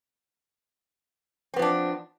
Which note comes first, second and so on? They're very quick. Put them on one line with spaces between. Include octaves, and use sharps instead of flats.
C4 B3 F3 D4